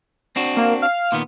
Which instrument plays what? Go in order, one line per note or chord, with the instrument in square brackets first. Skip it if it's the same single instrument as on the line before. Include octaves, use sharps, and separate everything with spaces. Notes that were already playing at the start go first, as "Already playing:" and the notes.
[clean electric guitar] C4 D4 F#4
[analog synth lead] A#3
F5
[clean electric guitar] A#2 D#3 B3